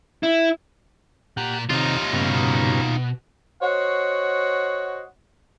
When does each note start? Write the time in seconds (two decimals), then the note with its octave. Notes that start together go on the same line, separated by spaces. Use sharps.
0.23 E4
1.37 A#2 G4 F#5 A#5
1.70 C3 D#3 D#4 F4 G4 C#5
2.13 G2 C#3 B3
2.30 B2
3.62 F#4 C5 C#5 D#5 F#5